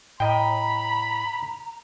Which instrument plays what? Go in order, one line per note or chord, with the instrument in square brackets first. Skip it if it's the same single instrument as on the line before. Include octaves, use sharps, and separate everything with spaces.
[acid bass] A2 [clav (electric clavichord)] D#5 G5 [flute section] A#5 [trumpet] B5